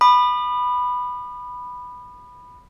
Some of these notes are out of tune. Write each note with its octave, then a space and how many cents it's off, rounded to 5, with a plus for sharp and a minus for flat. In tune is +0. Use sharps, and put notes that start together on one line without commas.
B5 +0 D#6 -45